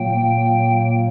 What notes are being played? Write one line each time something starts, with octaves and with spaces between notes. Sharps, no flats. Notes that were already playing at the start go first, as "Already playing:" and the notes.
Already playing: A#2 F#3 A#3 G5